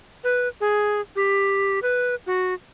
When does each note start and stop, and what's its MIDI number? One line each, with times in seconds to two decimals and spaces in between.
0.24 0.48 71
0.61 1.01 68
1.16 1.79 67
1.83 2.15 71
2.27 2.54 66